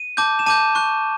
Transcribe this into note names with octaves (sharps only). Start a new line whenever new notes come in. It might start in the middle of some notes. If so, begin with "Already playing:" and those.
Already playing: D#7
A5 D6 G6
E7
A5 D6 G6 D#7
C#6 F#6